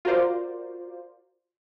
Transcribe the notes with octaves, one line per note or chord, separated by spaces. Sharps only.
F4 F#4 A#4 C5 D5